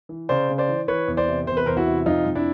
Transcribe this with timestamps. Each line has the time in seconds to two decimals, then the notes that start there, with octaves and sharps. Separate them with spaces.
0.09 E3
0.29 C#3 C5 D5
0.49 C#3
0.58 C5 D5
0.68 E3
0.88 E3 B4 C#5
1.08 E2
1.17 C5 D5
1.28 C3
1.47 E2 C5
1.57 B4
1.66 E2 A#4 C5
1.77 E4 F#4
1.86 C3
2.06 F2 D#4 F4
2.26 F2
2.35 D4 E4